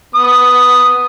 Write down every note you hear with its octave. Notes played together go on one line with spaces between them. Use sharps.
B3 D#6